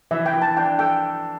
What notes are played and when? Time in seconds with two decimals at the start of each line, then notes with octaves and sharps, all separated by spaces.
0.11 E3 E5
0.26 G5
0.33 E3
0.42 A5
0.57 D4 G5
0.79 A4 G5